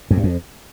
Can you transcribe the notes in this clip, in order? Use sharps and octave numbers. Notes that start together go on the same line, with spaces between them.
F2
G2
F2